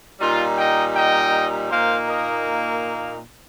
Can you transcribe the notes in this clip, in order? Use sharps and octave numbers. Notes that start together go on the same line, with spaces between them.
A#2 G3 D#4 F4
D#5 G5
D#5 G5
A#2 A#3 D#4 C5 F5
A#4 D#5